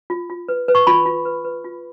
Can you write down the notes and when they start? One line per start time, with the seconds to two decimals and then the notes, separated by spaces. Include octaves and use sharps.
0.10 F4
0.30 F4
0.49 B4
0.68 B4
0.75 C#6
0.87 F4 B5
1.06 F4
1.25 B4
1.45 B4
1.64 F4